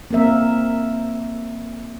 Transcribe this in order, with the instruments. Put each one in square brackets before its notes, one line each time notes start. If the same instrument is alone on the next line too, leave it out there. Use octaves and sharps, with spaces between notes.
[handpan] A#3 C4 A#4 E5